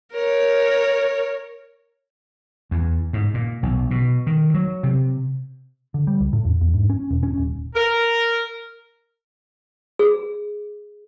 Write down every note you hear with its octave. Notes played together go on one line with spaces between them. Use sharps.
A#4 C#5
E2
G#2
A#2
B1
B2
D#3
F#3
C3
D3
G3
C#2
A2
E2
E2
G#2
C#4
E1
C#4
D#1
A#4
G#4